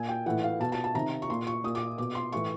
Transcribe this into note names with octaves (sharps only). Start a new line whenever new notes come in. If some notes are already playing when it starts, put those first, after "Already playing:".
Already playing: A#2 G#5
G5
A2 E3 F#5
F5
B2 A5
A5
A5
C3 D#3 A#5
C#6
A#2 C6
C#6
A#2 D#6
D6
B2 D6
C6
A2 E3 C#6